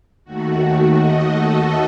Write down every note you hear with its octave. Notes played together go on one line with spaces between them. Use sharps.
D#2 D#3 A3 F#4
D#5
A4